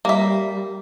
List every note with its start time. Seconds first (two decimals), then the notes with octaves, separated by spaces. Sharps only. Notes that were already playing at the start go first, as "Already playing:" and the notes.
0.05 G3 A#3 E5